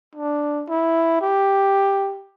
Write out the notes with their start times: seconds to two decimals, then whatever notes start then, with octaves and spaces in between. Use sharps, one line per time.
0.16 D4
0.69 E4
1.21 G4